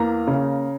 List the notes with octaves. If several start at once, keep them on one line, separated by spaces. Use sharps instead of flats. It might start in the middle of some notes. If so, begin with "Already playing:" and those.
Already playing: E2 A#3 A#5
C#3